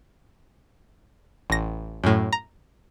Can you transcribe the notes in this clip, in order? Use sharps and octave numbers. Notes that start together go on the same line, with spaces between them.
A1 A#6
F#2 A2
A#5